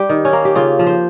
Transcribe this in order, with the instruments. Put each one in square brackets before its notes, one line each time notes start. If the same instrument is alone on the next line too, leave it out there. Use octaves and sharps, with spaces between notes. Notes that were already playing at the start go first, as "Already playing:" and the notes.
Already playing: [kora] G3 G4
D#3
C#4
A#3
G4
C#3 F4
F3
C5